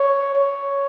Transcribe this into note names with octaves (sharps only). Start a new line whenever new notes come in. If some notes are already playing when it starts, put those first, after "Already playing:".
Already playing: C#5
C#5